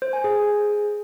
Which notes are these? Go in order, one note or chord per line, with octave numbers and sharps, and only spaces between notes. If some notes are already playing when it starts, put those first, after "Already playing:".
C5
G#5
G#4